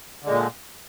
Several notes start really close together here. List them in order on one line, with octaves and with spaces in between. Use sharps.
D3 G#3 A#2